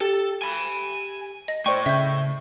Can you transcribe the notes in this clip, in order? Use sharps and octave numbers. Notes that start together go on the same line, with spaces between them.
G4 A4
G#5 B5
D#5
A2 C5 D5 G5 C#6
C#3 E5 G6